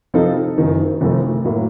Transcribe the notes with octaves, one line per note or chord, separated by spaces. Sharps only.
C3 F3 C4 D#4 A4
F#1 F#2 D#3
F1 F2 D#3 A3
A2 F#3 A#3